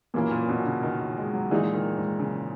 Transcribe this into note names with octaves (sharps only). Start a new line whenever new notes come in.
F#2 A#2 E3 A#3 C#4 E4
A#2
B2
C#3
D#3
D#3
G#3
F#3
A#2 E3 G#3 D#4
D#3
G#2
C#3